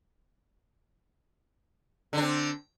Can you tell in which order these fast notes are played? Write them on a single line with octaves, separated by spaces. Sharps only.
D3 D4 C4